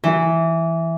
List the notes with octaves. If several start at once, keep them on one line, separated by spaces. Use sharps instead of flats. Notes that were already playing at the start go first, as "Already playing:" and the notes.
E3